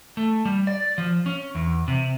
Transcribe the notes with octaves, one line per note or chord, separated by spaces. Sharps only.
A3
G3
D5
F3
C#4
E2
C3